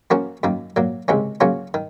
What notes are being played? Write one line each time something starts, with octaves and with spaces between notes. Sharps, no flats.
F3 A#3 C#4 F#4 A#4
F#2 D#3 A#3
A#2 F#3 A#3
C#2 C3 D#3 G#3 C#4
C#3 F#3 A#3 C#4 F4
D#3